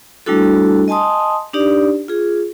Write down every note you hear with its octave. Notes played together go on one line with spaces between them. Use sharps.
G3 A3 D4 E4 F#4 A4
D#5 G#5 A5 C6 D#6
D4 D#4 G4 D5
F4 G#4